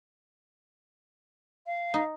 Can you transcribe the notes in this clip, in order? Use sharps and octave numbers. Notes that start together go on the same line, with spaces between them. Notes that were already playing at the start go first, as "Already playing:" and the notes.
F5
D#4